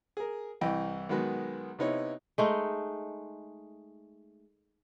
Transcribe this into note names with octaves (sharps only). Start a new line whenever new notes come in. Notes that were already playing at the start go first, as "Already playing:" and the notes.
G#4 A#4
C2 E3 D#5 G5
B1 D#3 G#3 B3 F#4
C3 B3 D#4 E4 C#5
G#3 A3 D#4